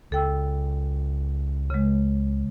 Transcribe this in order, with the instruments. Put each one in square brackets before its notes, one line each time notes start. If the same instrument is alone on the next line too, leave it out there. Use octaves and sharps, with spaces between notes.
[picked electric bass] C#2 [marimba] A4 G5 E6
[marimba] C#3 G#3